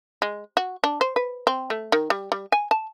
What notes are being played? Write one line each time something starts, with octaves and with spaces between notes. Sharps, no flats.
G#3
F#4
D4
C5
B4
C4
A3
D#3
G3
G3
G#5
A5